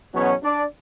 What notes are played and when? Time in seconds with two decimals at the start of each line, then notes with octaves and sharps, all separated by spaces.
0.13 E2 B2 F#3 B3 C#4 C#5
0.42 D4 D5